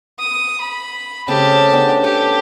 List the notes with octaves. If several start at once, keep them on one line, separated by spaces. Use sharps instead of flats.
D#6
B5
C#3 A3 C4 G4 A5
B3 C#4 D4
G4 A4